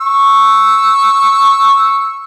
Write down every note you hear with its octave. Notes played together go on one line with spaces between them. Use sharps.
C#6 E6